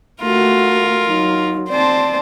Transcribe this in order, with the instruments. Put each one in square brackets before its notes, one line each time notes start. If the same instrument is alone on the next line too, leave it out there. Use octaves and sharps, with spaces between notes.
[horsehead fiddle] A3 F#4 [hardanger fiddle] F4 A#4
[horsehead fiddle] F#3 D#4
[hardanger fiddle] C4 C5 [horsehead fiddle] D5 A5